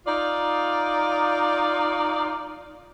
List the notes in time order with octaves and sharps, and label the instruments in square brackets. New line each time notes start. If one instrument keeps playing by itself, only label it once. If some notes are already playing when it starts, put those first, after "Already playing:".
[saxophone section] D#4 F4 D5